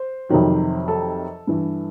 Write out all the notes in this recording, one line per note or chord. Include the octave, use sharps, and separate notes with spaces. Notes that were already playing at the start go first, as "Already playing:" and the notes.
Already playing: C5
F2 C3 D#3 F#3
A4
G2 E3